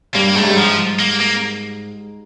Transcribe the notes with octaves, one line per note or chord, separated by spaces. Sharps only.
G2 A#3
G#2 A3
G2
G#2
F3
A#3
A#3